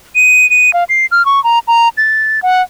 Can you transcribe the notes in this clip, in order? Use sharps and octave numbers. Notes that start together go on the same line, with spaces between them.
D#7
D#7
F5
C7
F6
C#6
A#5
A#5
A6
F#5